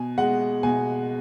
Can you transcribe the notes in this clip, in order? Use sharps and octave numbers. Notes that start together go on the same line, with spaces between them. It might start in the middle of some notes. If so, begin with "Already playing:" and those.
Already playing: B2 G#5
G#3 F#5
B2 G#5